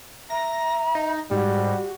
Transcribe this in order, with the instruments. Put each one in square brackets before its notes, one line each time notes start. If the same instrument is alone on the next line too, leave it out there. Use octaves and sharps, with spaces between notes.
[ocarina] E5 [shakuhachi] A#5 [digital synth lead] A#6
[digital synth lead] D#4
[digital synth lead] G#2 [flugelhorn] G3 [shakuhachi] F#4 [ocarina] G4